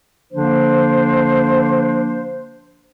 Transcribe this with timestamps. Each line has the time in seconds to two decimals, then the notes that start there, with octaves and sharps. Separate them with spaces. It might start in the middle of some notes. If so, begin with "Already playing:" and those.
0.33 D3 F3 A#3 D4 C5